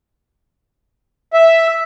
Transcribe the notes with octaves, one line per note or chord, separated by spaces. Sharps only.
E5